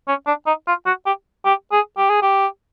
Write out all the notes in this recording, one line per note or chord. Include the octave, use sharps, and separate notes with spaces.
C#4
D4
D#4
F4
F#4
G4
G4
G#4
G4
G#4
G4